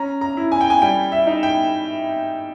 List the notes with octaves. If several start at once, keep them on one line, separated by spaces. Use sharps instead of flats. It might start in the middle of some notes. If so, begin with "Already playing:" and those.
Already playing: C#4 A#5
A#5
E4
G#5
G5
G#5
G3 G5
E5
D#4
G5